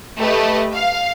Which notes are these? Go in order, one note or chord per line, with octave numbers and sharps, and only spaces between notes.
A3 G4 B4 D#5
F5